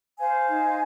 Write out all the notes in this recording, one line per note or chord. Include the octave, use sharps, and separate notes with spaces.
C5 F5 G#5
D#4